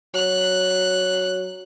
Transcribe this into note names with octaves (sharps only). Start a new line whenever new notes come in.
F#3 F#6